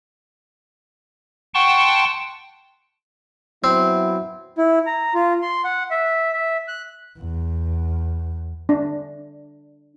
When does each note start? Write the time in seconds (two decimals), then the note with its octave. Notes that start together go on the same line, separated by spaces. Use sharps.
1.54 F#5 G5 A5 C6 C#6
3.64 F#3 B3 C4 E4
4.58 E4
4.86 A#5
5.14 F4
5.42 C6
5.64 F#5
5.91 E5
6.33 E5
6.68 F#6
7.18 E2
8.69 D4